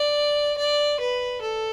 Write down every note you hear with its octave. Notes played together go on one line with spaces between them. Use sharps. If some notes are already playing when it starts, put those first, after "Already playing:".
Already playing: D5
D5
B4
A4